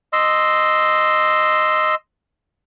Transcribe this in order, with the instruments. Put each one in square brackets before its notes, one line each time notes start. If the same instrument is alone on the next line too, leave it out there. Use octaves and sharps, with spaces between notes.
[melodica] D#5 C6 E6